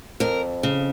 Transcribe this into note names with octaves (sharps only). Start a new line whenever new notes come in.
F2 A#4
C#3